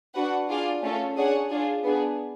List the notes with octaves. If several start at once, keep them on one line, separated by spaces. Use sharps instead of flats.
D4 F#4 B4 F#5
D4 F4 G#4 D5 F5
A3 C#4 F4 A4
D4 G#4 C#5 F#5
D4 F4 G#4
B3 D4 G#4